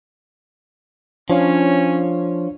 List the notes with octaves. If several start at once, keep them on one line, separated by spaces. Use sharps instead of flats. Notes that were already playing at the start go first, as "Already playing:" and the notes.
F3 C#4 D4 C#5 F5